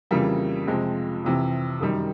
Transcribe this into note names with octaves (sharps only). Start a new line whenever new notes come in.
F2 C#3 E3 G3 A#3
F2 C3 F3 G#3
F2 C3 E3
F#2 D#3 G3